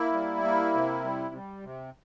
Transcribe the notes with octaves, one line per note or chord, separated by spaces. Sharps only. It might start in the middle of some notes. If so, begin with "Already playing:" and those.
Already playing: A#3 E4
G3
A#3
C3
G3
G3
C3